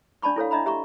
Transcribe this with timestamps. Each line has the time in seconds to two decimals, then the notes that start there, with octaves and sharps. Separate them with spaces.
0.22 D4 D5 A5 B5 C#6
0.36 E4 A4 C#5 F5
0.51 D4 D#5 E5 A#5 B5
0.66 G4 E5 A#5 C6 C#6